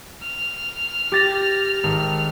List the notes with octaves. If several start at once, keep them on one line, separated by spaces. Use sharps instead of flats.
F6
G4 A6 A#6
G#1